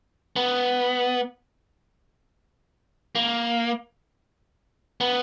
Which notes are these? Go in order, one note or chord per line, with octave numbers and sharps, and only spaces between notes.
B3
A#3
B3